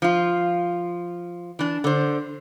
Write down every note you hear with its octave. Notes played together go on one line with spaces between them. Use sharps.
F3 F4
E3 D4
D3 C5